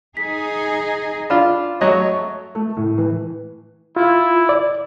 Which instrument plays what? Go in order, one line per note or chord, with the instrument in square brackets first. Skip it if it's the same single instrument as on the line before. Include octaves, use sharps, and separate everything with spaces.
[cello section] D#4 G#4 [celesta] B6
[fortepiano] D4 F4 [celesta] F5 B5
[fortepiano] F#3 D#5 [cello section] A3 [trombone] C#5
[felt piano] A3
A2
E3
[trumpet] E4 [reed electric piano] F4
[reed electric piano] D5